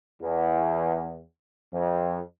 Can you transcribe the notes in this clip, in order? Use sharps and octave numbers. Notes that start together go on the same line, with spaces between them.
E2
F2